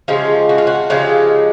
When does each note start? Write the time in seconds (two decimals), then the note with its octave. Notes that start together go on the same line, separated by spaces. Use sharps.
0.08 C#3 F3 G#3 G4
0.49 F#4
0.58 F4
0.67 F#4
0.90 C#3 F3 G#3 G4